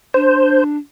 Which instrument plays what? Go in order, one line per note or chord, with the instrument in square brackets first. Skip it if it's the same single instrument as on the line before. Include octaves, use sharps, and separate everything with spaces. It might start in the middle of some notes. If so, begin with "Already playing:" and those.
[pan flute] D4 [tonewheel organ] C5